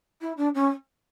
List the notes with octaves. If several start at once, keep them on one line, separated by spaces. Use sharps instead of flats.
E4
D4
C#4